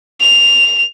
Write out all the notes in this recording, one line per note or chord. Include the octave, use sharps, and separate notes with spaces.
F7